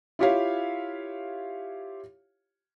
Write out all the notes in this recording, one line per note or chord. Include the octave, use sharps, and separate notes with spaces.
E4 F4 G4 C#5 E5 F5